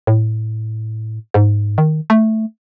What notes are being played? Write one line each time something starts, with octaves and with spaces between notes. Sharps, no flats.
A2
G#2
D#3
A3